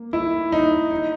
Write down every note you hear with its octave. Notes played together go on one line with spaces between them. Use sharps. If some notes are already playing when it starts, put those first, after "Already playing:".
Already playing: A#3
E4
D#4
D#4